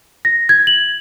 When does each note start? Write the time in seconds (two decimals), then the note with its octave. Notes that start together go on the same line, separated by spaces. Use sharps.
0.25 A#6
0.49 G#6
0.67 F#7